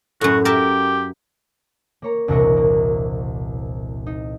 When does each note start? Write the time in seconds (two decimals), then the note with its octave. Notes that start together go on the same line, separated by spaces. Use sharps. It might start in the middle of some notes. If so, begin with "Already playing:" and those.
0.21 F#2 A2 F#4
0.45 G4 A#4 E5 A5
2.02 A#3 C#5 A#5
2.28 E1 C2 A#2 F#3 A#4 C#6
2.57 A#3
4.06 D#4